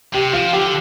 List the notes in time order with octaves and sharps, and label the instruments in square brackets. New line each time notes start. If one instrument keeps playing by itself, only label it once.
[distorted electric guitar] C3 [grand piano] G4
[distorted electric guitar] F3 [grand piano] F4
[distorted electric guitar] D3 [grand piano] G4